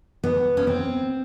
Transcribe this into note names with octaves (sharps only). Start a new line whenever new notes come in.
B3
C#4
C4